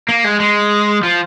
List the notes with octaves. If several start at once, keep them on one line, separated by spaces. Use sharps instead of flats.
A#3
G#3
G#3
F3